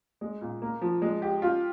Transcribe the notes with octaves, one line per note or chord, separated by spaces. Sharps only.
G#3
A#2
A#3
F3
G#3
G4
F4